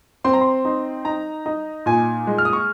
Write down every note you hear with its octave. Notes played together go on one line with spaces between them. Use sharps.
C4 C6
A#5
C6
D#4
D#4 A#5
D#4
A#2 G#5
G#3
F6
D#6
C#6